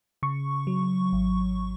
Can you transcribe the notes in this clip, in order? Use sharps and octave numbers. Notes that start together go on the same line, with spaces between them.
C#3 C#6
F#3
G#1